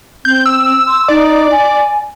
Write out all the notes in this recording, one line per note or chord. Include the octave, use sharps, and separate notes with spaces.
C4 G6
E6
C6
D#4 D5
G#5